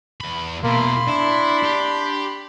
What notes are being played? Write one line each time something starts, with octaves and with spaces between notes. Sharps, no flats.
E2 B5
B2 A#3 E4 B5 C6
D4 E4
G4